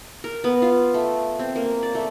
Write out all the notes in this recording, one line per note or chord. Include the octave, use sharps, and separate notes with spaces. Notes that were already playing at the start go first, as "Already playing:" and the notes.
A#4
B3
F4
A3
C4
A#3
D5
A3